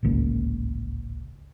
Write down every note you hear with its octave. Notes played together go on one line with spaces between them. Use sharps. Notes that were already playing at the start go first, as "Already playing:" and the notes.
D1 G#1 C#2 A#3